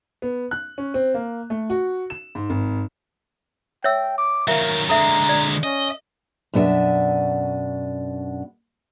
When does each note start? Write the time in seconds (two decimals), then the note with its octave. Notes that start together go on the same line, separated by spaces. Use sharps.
0.22 B3
0.51 F#6
0.78 C#4
0.94 C4
1.14 A#3
1.50 A3
1.70 F#4
2.10 E7
2.35 G#2
2.50 G#1
3.84 C#5 E5 G5 E6
4.18 D6
4.48 D#3 F#3 A#4 E5 F5
4.90 D3 G#3 A4 E5 A#5
5.29 D5
5.63 C#4 D#5
6.54 F#2 B2 D4 A4 E5